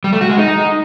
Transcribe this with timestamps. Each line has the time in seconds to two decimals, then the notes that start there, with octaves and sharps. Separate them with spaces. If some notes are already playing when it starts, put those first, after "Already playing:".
0.04 G3
0.13 A3
0.21 F#4
0.29 G#3
0.38 D#4